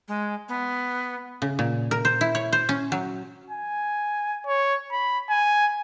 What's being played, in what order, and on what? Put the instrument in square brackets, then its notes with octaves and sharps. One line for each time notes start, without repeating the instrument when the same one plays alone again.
[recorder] G#3
B3
[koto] C#3
A#2
A#4
C5
E4
C#5
C5
C#4
F#3
[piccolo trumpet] G#5
C#5
B5
G#5